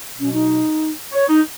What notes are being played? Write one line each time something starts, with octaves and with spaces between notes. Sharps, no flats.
B2 F#3 C#4
D#4
C#5
D#4